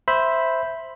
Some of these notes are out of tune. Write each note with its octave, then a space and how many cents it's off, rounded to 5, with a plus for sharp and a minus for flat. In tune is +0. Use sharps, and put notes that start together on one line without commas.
C5 +0 E5 +0 B5 +0